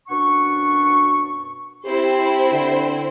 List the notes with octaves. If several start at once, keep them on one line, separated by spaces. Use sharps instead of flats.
F#2 B2 D4 F#5 C#6
C4 E4 G4 C5
D3